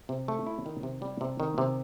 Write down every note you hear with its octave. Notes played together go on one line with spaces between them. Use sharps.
C3
A3
E4
D#3
C3
G3
C3
D#3
C3